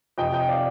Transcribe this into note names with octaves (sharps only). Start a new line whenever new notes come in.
F2 C3 F3 D#5 G5
D#5 G5
D5 F5